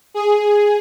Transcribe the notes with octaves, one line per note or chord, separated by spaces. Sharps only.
G#4